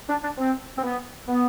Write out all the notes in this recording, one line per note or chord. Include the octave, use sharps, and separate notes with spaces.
D4
D4
C4
C4
B3
B3